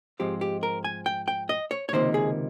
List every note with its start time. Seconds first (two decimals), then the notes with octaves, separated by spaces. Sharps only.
0.20 G#2 F3 G#3 C4 G4
0.41 G4
0.63 A#4
0.84 G#5
1.06 G5
1.28 G5
1.49 D#5
1.71 C#5
1.89 C#5
1.93 C#2 C3 D#3 A#3 C5
2.14 G#4